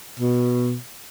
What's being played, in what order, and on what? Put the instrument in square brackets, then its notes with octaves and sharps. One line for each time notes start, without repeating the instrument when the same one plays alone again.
[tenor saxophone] B2